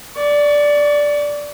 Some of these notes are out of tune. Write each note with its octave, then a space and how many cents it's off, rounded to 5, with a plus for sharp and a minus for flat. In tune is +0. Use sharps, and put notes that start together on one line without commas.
D5 -5 C#6 +35